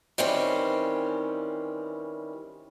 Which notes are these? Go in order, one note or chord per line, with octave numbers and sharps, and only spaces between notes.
D#3 E3 G3 C4 C#4